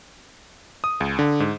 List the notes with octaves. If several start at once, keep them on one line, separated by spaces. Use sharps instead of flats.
D#6
C#2
D3
G#2